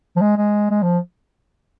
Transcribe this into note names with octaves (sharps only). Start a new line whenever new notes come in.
F3
G#3
G#3
G#3
F3